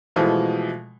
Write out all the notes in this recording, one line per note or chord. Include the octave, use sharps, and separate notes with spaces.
B2 E3 F3 G#3 A3